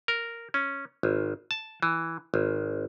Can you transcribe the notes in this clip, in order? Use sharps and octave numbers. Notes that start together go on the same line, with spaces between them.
A#4
C#4
G#1
A5
E3
G#1